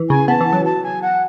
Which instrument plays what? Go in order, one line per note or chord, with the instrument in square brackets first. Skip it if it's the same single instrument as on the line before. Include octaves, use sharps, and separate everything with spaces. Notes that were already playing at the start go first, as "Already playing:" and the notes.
Already playing: [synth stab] E3
[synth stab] C#3 [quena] G#5
[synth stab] B3 [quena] A5
[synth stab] E3
F#3
[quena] A5
G#5
F#5